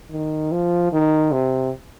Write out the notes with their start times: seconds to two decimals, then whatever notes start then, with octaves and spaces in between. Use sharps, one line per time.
0.11 D#3
0.52 F3
0.93 D#3
1.32 C3